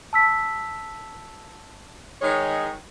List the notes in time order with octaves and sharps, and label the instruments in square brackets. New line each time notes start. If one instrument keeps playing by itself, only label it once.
[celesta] A5 E6 B6
[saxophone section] D#3 G#3 C#5